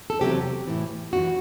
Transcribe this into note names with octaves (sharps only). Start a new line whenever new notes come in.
A4
E2 C3 F#3 G4
A2 E3
F#2 E3 F#4